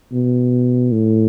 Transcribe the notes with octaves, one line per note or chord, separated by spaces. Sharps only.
B2
A2